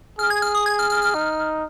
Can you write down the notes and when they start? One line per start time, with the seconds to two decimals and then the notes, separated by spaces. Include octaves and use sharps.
0.19 G#4 F6
0.30 G#6
0.42 F6
0.55 D#6
0.66 G#6
0.79 F6
0.90 F6
1.02 F6
1.14 D#4